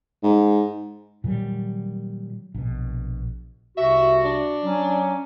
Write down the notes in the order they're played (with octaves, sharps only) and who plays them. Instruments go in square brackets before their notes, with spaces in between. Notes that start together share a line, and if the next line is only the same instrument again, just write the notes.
[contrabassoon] G#2
[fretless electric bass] A#2 D#3 F#3 G3
A#1 B2
[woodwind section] C2 C3 F#4 [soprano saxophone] E5
[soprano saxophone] D4
[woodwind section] F#3 C#4